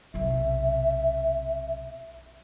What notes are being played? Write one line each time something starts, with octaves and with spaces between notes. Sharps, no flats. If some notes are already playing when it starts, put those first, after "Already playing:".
B1 C3 E5